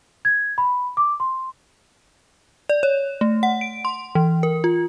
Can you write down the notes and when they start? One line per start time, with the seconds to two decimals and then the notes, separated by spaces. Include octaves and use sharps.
0.25 G#6
0.58 B5
0.97 D6
1.20 C6
2.69 D5
2.83 C#5
3.21 A3
3.43 F#5
3.61 D7
3.85 C6
4.15 E3
4.43 A#4
4.64 F4